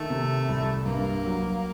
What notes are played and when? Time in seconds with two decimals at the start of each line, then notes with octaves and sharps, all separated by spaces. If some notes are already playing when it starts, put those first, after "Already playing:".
Already playing: D#3 A3
0.10 C3
0.49 C2
0.85 G2 A#3
1.23 F#3